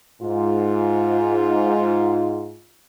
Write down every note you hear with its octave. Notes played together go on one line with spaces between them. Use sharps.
G#2 F4